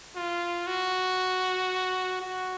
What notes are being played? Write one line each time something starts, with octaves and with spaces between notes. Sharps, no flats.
F4
F#4
F#4